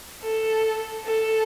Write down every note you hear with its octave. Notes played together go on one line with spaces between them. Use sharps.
A4
A4